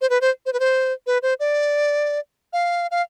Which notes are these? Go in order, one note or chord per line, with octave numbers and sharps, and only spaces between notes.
C5
B4
C5
C5
B4
C5
B4
C5
D5
F5
F5